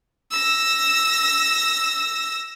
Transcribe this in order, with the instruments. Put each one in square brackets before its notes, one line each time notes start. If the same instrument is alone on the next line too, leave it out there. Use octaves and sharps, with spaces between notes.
[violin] E6 A#6